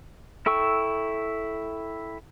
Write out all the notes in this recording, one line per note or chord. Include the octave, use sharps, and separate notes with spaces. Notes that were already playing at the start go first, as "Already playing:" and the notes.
E4 A4 G5 C#6 E6